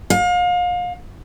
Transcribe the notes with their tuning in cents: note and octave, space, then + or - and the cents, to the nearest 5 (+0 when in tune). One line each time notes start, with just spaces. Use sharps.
F5 +35